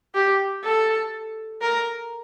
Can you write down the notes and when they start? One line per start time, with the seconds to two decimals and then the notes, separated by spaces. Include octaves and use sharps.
0.15 G4
0.64 A4
1.61 A#4